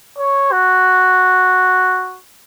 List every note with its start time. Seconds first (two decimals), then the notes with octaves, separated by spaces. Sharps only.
0.18 C#5
0.52 F#4